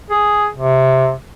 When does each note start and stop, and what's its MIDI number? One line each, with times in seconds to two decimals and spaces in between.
0.10 0.46 68
0.55 1.11 48